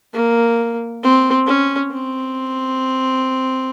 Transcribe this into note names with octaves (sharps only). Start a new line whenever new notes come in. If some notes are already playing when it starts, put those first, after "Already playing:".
A#3
C4
C#4
C4